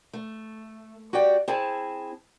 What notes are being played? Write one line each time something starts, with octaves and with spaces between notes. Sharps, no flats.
A3
F#4 G4 D5 G5
C4 E4 G#4 A5